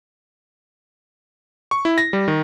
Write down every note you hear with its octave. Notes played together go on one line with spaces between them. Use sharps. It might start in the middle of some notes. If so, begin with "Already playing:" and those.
C#6
E4
A#6
G3
D#3